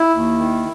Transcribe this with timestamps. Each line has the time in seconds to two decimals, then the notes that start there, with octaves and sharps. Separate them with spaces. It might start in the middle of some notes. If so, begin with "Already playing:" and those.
Already playing: E4
0.15 D#2
0.38 D#3